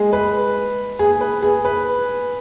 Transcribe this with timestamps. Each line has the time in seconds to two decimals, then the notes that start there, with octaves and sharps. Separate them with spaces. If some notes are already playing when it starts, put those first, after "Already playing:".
Already playing: G#3 G#4
0.13 B4
0.99 G#4
1.21 B4
1.42 G#4
1.65 B4